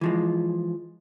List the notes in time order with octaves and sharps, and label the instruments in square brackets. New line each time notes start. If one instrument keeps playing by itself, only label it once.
[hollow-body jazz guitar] E3 F3 G#3